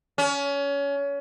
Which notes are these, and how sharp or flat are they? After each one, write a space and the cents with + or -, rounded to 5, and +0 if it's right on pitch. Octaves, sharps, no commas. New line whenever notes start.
C#4 +25